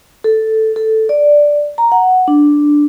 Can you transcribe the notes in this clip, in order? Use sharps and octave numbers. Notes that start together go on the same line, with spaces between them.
A4
A4
D5
A#5
F#5
D4